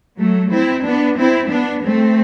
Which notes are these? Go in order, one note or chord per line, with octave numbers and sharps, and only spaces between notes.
F#3 A3
C4 E4
B3 D4
C4 E4
B3 D4
A3 C4